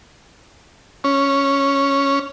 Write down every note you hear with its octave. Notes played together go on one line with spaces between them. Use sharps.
C#4